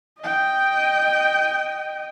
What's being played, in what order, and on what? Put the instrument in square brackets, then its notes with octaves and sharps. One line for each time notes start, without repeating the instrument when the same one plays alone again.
[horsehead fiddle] D#5 G5